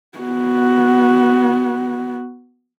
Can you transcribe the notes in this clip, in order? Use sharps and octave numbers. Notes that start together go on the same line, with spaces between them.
B3 F#4